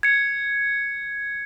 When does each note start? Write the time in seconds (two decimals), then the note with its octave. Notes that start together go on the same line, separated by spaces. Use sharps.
0.03 G#6 C#7